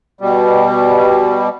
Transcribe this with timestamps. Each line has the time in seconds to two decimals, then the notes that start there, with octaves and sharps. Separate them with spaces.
0.21 B2 G3